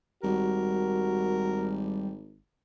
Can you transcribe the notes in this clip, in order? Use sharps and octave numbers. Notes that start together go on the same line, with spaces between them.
G#1 G3 F#4 A#4